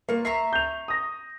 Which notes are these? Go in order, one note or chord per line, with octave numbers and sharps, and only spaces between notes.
A#3 F4 C#6
E5 A#5 C#6 C7
G6 F7
D#6 A#6